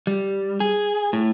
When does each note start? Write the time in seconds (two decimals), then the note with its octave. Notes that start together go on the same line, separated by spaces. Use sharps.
0.07 G3
0.60 G#4
1.13 A2